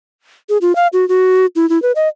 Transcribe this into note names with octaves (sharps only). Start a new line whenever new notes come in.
G#4
F4
F5
F#4
F#4
E4
E4
B4
D#5